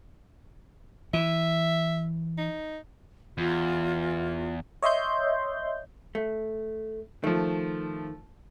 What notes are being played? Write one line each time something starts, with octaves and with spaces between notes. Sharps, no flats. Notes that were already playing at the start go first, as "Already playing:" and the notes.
E3 E5
D#4
E2 F4
C#5 D#5 E5 C6 G6
A3
D#3 F3 A3